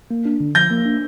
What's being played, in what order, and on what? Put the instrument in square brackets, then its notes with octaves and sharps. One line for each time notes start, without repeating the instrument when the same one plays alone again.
[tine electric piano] A#3
D4
D3
[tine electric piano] F3 [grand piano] G6 A#6
[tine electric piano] A#3
D4